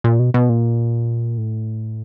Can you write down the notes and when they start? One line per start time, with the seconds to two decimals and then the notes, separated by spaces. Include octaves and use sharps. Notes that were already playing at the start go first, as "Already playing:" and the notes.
0.04 A#2
0.19 B2
0.34 B2
0.49 A#2
1.38 A2